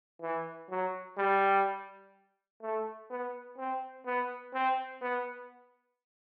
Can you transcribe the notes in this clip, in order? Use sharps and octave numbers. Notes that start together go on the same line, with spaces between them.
E3
F#3
G3
A3
B3
C4
B3
C4
B3